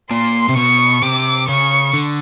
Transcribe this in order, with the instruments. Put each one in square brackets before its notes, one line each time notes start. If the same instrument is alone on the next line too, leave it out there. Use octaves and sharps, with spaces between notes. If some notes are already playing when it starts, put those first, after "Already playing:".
[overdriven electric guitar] A#2 [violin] C6
[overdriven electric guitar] C3
[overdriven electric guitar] B2 [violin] C#6
[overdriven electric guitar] C3 [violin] D6
[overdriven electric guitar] C#3 [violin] C#6
[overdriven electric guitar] D3